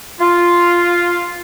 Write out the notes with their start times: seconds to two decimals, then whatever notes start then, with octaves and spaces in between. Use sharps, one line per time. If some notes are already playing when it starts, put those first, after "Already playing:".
0.20 F4